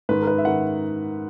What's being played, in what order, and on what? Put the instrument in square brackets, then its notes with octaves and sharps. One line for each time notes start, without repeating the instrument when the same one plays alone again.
[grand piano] G#2 D#3 B4
A#4
B4
E5
D#3 F#5